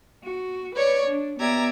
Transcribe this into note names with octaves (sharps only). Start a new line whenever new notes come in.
F#4
B4 C#5 D5 C#6
D4
B3 G4 D5 E5 A#5 G#6